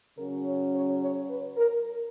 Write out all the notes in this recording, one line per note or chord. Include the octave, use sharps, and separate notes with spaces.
C#3 F#3 C#4 A#4
C#5
C#5
C#5
B4
A#4